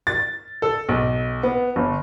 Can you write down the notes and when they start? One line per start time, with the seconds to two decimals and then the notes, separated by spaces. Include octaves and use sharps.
0.07 A6
0.62 A4
0.89 B1
1.43 B3
1.76 G1